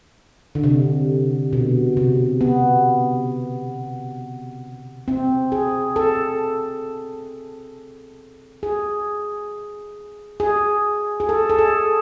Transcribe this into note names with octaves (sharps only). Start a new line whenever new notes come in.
D3
C3
B2
C3
B3
C4
G#4
A4
G#4
G#4
G#4
A4
A4
G#4